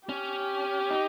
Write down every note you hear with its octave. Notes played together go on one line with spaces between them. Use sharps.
C#4 G4
D#4